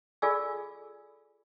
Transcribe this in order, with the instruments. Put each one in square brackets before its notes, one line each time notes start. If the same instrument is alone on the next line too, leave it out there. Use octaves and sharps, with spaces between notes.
[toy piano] F4 G#4 A4 D5 G#5 E6